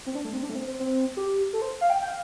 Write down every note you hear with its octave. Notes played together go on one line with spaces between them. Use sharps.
C4
D4
A3
C4
D4
A3
C4
C4
C4
G4
A4
C5
F5
G5
G5
F5